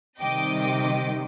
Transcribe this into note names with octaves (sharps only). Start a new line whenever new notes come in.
C3 D#3 G3 D#5 G5 D6